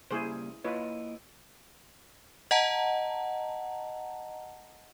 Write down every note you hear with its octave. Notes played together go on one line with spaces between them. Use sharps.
C#3 G3 A#3 E4 G#4 C5
A#3 E4 F4 B4 C#5 D#5
D#5 F#5 A5 A#5